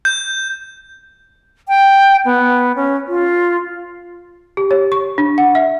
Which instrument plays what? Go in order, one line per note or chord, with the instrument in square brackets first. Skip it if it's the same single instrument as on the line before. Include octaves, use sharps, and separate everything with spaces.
[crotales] G6
[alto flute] G5
B3
C#4
F4
[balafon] G4
C#5
C#6
D4
F#5
E5